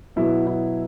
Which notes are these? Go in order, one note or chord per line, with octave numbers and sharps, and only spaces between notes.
B2 F#3 B3 E4
E4